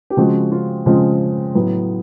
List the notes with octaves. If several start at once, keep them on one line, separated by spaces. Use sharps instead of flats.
G4
C#3 F3 G#3 C4 F#4
F4
C#3 F3 G#3 C4 F4
A2 F#3 B3